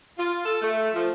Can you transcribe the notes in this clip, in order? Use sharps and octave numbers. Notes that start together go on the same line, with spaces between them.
F4
A4
A3
F3